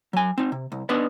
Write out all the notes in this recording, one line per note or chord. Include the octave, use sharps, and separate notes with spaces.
F#3 G#5
C4 D#4
C3
C2
B3 D4 D#4 B4 D5